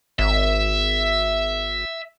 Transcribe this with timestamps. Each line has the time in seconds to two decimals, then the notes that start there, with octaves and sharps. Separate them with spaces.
0.19 G#1 E5